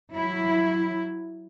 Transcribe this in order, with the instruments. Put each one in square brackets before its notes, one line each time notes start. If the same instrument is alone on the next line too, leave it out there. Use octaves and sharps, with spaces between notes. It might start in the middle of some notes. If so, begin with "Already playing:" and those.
[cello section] F#3 E4